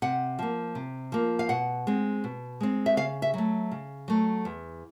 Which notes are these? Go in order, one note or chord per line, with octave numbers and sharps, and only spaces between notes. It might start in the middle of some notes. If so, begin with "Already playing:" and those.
C3 F#5
F3 A#3
C3
F3 A#3
F5
B2 F#5
G#3 C4
B2
G#3 C4
E5
C#3 F5
E5
F#3 A3
C#3
F#3 A3
E2